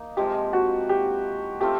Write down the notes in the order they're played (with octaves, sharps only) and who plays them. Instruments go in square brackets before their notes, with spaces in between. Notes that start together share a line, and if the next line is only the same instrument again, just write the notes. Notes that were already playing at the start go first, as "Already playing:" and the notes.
Already playing: [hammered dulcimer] A#3 D#4
[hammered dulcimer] C3 F3 G#3 [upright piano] G4
[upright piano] F#4
G4
[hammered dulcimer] A3 C4 F4 [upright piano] G4